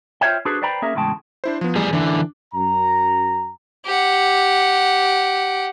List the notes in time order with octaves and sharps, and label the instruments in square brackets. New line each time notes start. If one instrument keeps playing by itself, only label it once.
[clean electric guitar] F4 G#4 C5 C#5 E5 G5
D4 F#4 G#4 A4 B4 C5
B4 C5 D5 G5 A#5 B5
A#3 C#4 G#4 A#4 E5
E2 A2 C#3 G#3 G5 A5
[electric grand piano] D4 E4 C5
F3 B3
[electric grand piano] E2 [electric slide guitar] G3 G#4
[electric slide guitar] D3 E3 [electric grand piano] D4 D6
[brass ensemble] F#2 A#5
[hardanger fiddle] G4 F#5